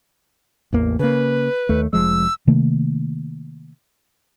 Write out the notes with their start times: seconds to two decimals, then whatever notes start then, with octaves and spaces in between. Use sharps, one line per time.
0.73 A1 E2 A#3
0.99 C#3 A#3 B4
1.69 D#2 A3
1.93 F1 F3 G#3 E6
2.47 C3 D#3 A3 A#3